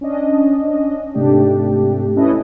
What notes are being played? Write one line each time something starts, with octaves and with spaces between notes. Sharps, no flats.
C#4 D4 D#5
G#2 C3 A3 D4 G4
C#4 E4 A4 B4 D#5